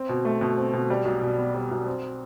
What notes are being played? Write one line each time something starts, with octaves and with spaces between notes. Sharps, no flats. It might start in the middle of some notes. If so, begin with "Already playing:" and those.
Already playing: C4
B2
A3
B2
C4
B2
G3
B1
B2
B3
G3
B1
C4